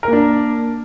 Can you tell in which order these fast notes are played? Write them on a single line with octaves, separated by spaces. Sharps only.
A#4 A#3 D4